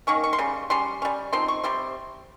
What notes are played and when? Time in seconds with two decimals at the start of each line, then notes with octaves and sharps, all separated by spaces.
0.07 D#3 A#3 C#4 C#6
0.24 C#6
0.33 C6
0.39 C#3 G3
0.70 G3 C#4 C6
1.02 G3 C#4
1.33 F3 C4 D#4 C6
1.48 C#6
1.64 C3 G3 C4 C6